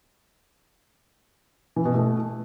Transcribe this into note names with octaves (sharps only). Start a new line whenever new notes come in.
E3
B2
A3